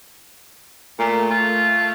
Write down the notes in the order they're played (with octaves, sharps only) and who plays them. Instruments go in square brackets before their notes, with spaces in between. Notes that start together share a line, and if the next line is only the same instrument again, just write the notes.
[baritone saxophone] A#2 [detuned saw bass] A3
[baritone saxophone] F4